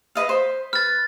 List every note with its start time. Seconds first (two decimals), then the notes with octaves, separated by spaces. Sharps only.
0.15 B4 D#5 F5
0.29 C5 B5
0.73 B4 F6 A6